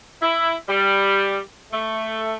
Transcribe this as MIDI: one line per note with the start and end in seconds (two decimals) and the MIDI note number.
0.22 0.54 64
0.68 1.39 55
1.72 2.35 57